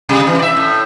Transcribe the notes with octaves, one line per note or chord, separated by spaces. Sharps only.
C3 G3
E3
D5 E5
A2